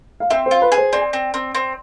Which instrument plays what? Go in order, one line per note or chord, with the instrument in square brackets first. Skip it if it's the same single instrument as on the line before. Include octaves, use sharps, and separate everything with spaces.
[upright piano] F5
[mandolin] C4 [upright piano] E5
[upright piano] C5
[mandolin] F4
[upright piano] B4
[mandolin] G#4
[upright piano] C5
[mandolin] C4 [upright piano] D5
[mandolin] C4
C4
C4